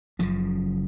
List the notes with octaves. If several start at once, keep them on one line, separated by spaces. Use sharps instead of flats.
F#1 F#2 C#3 F3